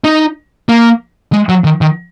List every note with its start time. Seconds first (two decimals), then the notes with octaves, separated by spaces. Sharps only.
0.04 D#4
0.69 A#3
1.33 G#3
1.49 F#3
1.64 D#3
1.81 D#3